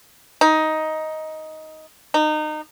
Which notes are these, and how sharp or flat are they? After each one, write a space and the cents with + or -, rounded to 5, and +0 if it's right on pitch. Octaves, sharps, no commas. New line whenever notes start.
D#4 +10
D#4 -25